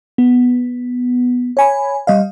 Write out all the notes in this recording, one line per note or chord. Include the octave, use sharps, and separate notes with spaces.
B3
C#5 G#5 B5
G3 D#5 F5